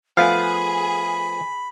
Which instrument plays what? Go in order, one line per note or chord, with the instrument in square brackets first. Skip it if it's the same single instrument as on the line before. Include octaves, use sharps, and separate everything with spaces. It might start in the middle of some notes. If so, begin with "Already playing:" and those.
[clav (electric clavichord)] F3 A3 B3 [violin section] G#4 [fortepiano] F5 [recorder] B5